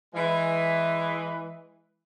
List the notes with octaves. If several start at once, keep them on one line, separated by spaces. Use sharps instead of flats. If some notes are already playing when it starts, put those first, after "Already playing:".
E3 G#3 B4